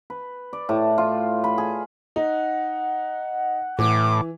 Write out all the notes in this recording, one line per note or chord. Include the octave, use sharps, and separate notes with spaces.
B4
D5
A2
F4
B5
G#4
D#4 F#5
A2 E3 D6